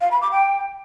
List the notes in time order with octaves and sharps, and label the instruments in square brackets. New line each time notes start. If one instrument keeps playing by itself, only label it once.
[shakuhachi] F5
B5
D6
G5